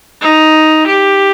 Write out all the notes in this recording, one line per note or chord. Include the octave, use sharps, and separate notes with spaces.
D#4
G4